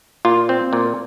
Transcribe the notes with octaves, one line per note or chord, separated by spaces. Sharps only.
A#2 F4
C4
A#2